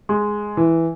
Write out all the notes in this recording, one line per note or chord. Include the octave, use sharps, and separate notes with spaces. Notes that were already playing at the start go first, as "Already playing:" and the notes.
G#3
E3